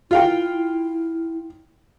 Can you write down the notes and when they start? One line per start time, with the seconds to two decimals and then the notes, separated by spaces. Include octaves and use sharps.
0.11 E4 F4 F5 G5